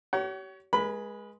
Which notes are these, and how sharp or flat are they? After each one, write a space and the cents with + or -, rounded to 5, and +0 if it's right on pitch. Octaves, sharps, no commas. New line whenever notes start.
G4 -40 C#5 +25 F#5 +45
G#3 +0 B4 -35 B5 +10